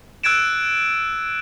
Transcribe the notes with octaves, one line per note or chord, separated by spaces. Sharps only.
E6 F#6 G#6 A6 D7 E7